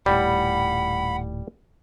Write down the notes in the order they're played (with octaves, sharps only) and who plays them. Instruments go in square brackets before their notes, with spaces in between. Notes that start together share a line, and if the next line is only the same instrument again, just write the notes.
[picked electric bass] D#1 A2 [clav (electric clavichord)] G3 [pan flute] F#5 [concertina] B5